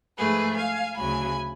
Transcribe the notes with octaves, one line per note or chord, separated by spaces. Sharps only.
G#2 F3 A3 G#4 B4
F5 G#5
D2 C#3 F#3 G#5 B5